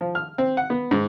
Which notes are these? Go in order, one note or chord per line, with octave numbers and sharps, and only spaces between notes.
F3
F6
C4
F#5
B3
G#2